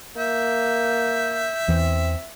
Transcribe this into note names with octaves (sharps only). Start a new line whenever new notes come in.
A#3 E5 G6
E2 E3 C4